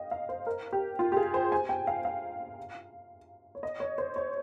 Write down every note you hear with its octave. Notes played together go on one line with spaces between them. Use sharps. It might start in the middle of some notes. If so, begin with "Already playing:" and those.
Already playing: D#5 F5 G5
F5
C5
A#4
G4
F4
G4
G#4
C5
G#5
G5
F5
F5
C#5
D#5
C#5
C5
C#5